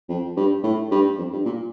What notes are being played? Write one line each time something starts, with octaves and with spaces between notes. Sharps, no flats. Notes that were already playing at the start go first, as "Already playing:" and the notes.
F2
G2
A2
G2
F2
G2
A#2